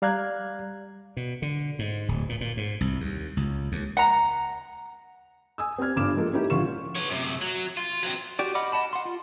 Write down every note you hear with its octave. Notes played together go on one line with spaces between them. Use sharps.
G3 D5 F5 A#5 F#6 G#6
B2
D3
G#2
D1
A#2
A#2
G#2
C2
D#2
C#2
D#2
F#5 A#5
G#5 D#6 E6
C4 G4 D5 F6 G#6
G1 G2 D6 E7
F3 G#3 A#3 G4 A4
A#3 C#4 D#4 E4 G4
A#1 D3 F4 C#6 E7
B3 C#5
F#2 C3
F#3
F4
F#3 C4
F#4 G4 D5
D#5 F#5 B5 D6 F6
D#5 F#5 A5 B5
F#5 C6
F4